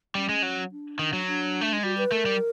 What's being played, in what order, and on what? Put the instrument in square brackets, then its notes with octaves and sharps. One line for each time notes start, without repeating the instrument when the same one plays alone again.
[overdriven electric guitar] G3 [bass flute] C#4
[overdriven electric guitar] G#3
F#3
[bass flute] D4
[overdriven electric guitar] D#3
F#3
[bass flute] D4
[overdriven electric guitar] A3
G#3
[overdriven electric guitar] G3 [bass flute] F#4
[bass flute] B4
[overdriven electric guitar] A3 [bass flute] A#4
[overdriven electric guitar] G3